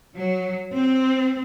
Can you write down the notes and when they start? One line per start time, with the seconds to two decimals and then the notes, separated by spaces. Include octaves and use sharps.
0.15 F#3
0.75 C4